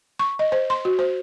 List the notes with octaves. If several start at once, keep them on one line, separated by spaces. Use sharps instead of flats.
C#6
D#5
C5
C6
F#4
C5